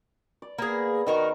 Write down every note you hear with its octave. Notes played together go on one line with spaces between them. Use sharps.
D5
A#3 B3 G#4
D#3 D#4 F#4 A#4